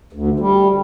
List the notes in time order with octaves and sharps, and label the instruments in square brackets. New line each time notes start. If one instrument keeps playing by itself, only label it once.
[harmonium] D2
G3